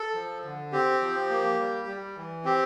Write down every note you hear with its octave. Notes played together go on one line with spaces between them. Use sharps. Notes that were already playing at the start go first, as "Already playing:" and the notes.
Already playing: A4
F3
D3
C4 G4
F3
A#3
G3
G3
E3
C4 G4